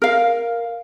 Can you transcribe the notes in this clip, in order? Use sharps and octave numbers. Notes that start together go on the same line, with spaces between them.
A#4 F5